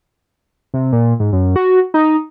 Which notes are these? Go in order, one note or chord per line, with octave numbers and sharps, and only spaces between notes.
C3
A#2
G#2
F#2
F#4
D#4